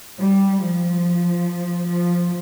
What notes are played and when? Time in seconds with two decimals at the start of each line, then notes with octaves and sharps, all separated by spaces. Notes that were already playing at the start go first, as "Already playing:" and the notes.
0.19 G3
0.61 F3
1.87 F3